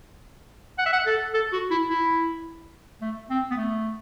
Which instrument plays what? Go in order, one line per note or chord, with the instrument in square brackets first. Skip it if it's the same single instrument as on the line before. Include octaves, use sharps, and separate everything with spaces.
[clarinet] F#5
E5
F#5
A4
A4
F#4
E4
E4
A3
C4
B3
A3